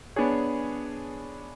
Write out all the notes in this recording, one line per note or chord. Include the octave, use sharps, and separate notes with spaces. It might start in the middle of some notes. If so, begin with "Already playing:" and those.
B3 D4 G#4 C#5